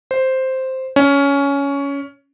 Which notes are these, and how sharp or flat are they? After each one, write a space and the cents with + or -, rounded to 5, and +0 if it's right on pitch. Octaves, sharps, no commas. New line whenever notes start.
C5 +0
C#4 +15